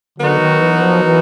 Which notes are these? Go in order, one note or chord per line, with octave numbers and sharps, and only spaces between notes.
D3 F#3 B3 D#4 F#4 A#4
D#3
E3
F3
E3